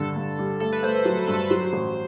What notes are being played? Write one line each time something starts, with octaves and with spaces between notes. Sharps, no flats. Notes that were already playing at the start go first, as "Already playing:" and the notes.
Already playing: G2 D3 A4
G2
G3
A3 A4
B4
A3 C5
C5
F#3 C5
G2 A4
B4
F#3 C5
A1